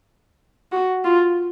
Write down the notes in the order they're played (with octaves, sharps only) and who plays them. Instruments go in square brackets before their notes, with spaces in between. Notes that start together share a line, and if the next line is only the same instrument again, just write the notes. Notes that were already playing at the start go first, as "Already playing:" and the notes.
[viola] F#4
F4